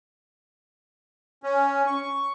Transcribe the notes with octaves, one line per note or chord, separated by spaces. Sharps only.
C#4
C#6